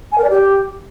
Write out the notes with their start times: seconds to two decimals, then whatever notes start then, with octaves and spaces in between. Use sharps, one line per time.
0.12 G#5
0.18 A#4
0.24 D5
0.30 G4